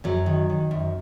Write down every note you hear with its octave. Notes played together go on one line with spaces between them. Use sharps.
F#2 F#3
D#3
D#3
F#2